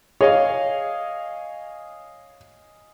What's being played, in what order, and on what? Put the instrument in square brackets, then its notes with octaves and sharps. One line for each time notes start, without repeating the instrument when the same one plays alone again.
[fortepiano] G#4 D#5 F5 [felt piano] C#5